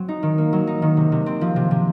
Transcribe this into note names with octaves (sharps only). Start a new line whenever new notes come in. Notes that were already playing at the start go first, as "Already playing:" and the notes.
Already playing: F#3 C4
D#4
D#3
A#3
F#3
D#4
D#3
C3
C3
C4
F3
C3
C3